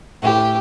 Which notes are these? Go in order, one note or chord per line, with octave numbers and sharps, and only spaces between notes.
A2 G4